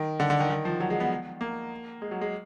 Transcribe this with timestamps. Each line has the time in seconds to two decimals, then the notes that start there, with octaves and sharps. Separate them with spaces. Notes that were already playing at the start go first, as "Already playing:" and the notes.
Already playing: D#3
0.20 D3
0.30 D3
0.40 D#3
0.50 D#3
0.65 F3
0.80 F#3
0.90 G#3
1.00 B3
1.41 A#3
2.02 G#3
2.11 F#3
2.21 G#3